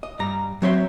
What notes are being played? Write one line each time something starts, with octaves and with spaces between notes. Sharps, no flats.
D#5
G2 G3 A#5
F#3 C4 C#5 E5 B5 C6